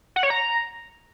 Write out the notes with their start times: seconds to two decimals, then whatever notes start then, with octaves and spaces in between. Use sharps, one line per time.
0.16 F#5
0.23 C#5
0.30 A#5